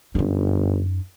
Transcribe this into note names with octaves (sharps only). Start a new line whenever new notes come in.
G1 F#2 D#4